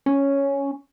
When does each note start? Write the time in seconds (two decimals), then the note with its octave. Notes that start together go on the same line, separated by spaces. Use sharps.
0.06 C#4